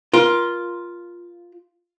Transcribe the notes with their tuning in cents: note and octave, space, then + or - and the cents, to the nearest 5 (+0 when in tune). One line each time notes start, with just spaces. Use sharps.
F4 +0 A#4 +30